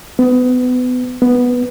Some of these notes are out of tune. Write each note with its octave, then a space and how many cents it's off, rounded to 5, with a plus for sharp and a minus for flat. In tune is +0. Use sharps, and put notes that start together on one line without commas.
B3 +25
B3 -5